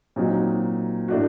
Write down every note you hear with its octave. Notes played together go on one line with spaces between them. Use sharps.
A#2 F#3 C4 D#4 F#4
A2 A3 D4 F#4